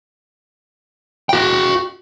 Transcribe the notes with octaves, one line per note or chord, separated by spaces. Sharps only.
F#4 G5